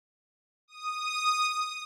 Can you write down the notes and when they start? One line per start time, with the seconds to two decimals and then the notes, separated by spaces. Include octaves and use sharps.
0.68 D#6